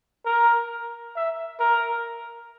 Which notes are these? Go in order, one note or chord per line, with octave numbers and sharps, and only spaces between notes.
A#4
E5
A#4